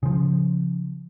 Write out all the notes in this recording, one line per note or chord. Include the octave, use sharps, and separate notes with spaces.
C#3 F3